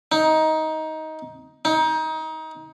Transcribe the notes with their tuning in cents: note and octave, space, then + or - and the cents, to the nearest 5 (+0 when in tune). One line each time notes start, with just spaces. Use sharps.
D#4 +15
D#4 +25